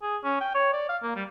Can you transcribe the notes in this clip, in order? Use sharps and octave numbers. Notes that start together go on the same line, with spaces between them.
G#4
C#4
G5
C#5
D5
F5
A#3
G3